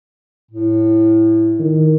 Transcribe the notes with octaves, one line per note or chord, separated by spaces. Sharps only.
A2
D#3